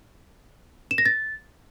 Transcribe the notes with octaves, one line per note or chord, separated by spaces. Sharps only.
E7
A#6
A6